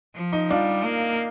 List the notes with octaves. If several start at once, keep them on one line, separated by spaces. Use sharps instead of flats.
F3
D#4
G3 D4 F4
A#3